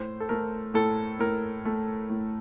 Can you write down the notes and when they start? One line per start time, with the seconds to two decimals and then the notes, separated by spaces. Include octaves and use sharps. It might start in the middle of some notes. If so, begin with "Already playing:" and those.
Already playing: A2 C5
0.20 A4
0.29 A3 A#4
0.74 A2 A4
1.19 A2 A#4
1.65 A3
2.10 A2